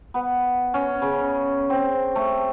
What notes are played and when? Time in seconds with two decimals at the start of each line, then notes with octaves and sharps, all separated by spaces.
0.14 B3
0.74 C#4
1.02 C#3
1.70 C4
2.16 A3